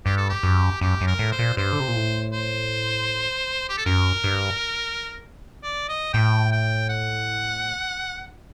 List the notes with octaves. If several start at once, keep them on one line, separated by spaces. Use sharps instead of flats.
G2 G4
A4
G4
F#2
F#2 G4
F#2
A#4
A2
C5
A#2
G2 C5
D3
C3
A#2
A2
C5
G4
A4
F#2 A#4
G2
D5
D#5
A2 G5
G5
F#5